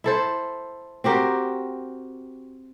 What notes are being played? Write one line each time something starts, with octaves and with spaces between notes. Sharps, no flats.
E4 A4 C5
C4 F#4 G4 A#4